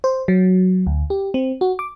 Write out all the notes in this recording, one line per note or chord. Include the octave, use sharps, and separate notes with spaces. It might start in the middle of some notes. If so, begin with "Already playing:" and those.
C5
F#3
D2
G4
C4
F#4
D6